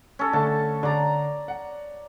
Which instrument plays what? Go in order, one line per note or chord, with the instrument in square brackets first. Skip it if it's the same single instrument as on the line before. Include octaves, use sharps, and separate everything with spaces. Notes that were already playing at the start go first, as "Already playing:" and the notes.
[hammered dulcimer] C#4 A4
[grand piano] D3 A3 A4 [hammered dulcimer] A5
[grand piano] D3 [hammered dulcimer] D5 A#5
[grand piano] F#5